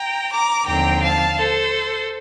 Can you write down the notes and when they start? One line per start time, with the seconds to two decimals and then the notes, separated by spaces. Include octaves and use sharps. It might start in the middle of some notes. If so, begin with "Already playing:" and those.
Already playing: G5 A#5
0.31 A#5 D6
0.66 D#2 D3 F3 C4 G5 A#5
1.03 F5 A5
1.37 A4 C5